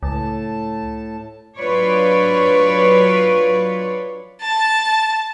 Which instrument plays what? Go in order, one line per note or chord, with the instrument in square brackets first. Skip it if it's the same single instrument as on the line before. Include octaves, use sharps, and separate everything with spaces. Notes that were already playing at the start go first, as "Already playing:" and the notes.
[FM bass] C#2 [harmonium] A2 A5
[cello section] F#3 D4 F4 B4 C#5 D5
[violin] A5